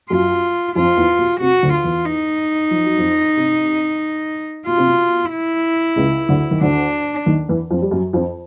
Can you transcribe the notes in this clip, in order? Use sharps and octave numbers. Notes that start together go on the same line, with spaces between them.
F#2 F#3 F4
F2 F3 F4
E2 E3
B2
C3 F#4
D2 D3
F4
E2 E3
D#4
F3
F#3
F2 F3
C3
B2 F4
C3
B2
E4
C#2 C#3
D2 D3
D#3
D2 D3 D4
D#2 D#3
E2 E3
F2 F3
G3
F#2 F#3
F2 F3